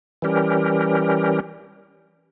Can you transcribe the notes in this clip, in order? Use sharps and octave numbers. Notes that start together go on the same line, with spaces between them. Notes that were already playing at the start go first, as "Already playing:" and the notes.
E3 G3 C#4 G4 A#4